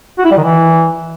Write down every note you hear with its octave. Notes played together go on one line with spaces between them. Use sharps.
F#4
E4
G3
D#3
E3